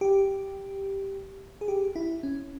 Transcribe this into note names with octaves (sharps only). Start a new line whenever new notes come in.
G4
G#4
G4
E4
C#4